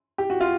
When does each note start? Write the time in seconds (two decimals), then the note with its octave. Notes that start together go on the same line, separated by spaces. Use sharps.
0.18 G4
0.30 F#4
0.40 F4